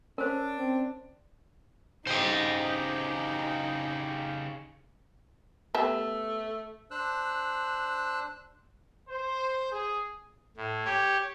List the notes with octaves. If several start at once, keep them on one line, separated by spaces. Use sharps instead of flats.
C#4 D4 A#4 C5
C4
C#3 D#4 G4 C5 D#5
A3 B3 G4 E5
D4 C5 E6 F#6
C5
G#4
A2
G4 C#5